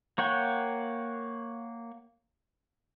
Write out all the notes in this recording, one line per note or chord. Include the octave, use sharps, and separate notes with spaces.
A#3 C#5 F#5 G5 C#6